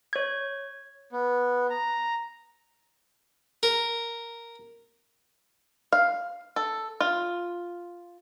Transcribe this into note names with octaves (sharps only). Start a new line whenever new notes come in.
C#5 G#6
B3
A#5
A#4
F5
A4
F4